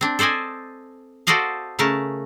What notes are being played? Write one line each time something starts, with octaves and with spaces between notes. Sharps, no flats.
C4 D4
A4 C5 D5 D#5 G#5
F#4 A4 C5 D5 D#5 F5
C#3 A3 A#4 A5